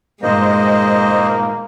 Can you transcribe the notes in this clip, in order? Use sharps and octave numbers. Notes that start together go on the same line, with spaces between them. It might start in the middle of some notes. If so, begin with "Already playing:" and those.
G2 A#2 D#3 G#3 A#3 C5 D#5